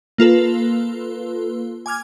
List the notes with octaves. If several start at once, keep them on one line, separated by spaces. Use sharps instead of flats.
A#3 F4 A4 B4
G#5 D6 F6 G#6